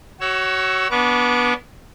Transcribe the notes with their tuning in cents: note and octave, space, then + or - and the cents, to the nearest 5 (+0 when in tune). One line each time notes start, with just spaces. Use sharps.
F#4 +25 C#5 +0 E6 +0
B3 -20 D4 -20 D6 -40